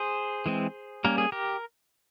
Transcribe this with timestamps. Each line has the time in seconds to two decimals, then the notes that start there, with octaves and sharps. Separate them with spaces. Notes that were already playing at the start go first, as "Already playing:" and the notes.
Already playing: G#4 C5
0.46 E3 G#3 C4
1.04 G3 A#3 C#4 A#4
1.18 G#4
1.32 G4 A#4